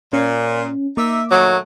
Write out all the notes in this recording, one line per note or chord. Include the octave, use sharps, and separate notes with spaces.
A#2 C#4
A#3 D#4 E5 D6
A#2 D#3 F#3 A3